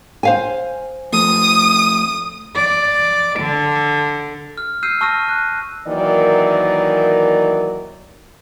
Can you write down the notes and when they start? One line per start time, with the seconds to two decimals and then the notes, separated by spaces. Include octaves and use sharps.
0.23 C5 F5 G#5
1.12 F3 A3 D#6
2.56 D5
3.39 D3
4.58 F6
4.83 E6 F6 G6 C7 D#7
5.01 A5 C#6 E6 F6 A#6 D#7
5.29 F#6
5.87 D#3 E3 F#3 A#3 D5